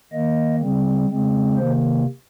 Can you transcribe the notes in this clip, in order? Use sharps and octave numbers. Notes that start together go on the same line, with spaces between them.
D#3 A#3 D#5
C#3 G3 C4
C#3 G#3 C4
C3 D#3 A#3 C5